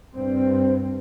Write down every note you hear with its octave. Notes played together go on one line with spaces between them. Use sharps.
G2 C4